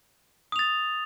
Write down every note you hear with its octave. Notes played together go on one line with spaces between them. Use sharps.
D#6 A6 F7